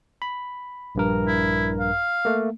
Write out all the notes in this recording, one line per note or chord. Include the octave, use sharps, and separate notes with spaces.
B5
A#1 G2 A#4
E4
F5
A3 A#3